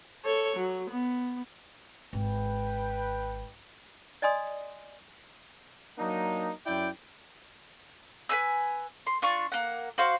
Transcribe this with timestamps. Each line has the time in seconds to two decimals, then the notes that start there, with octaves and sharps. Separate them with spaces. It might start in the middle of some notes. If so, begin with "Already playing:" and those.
0.25 A4 C#5
0.57 F#3
0.91 B3
2.13 G#1 B4 G5
4.22 D5 D#5 G#5 C6 D#6
5.98 F#3 A#3 D4 D#4
6.66 F#2 E4 D5 G5
8.29 B4 C5 G#5 E6
9.07 C6
9.22 D4 F4 C#6
9.52 A#3 F#5
9.98 F#4 C5 F5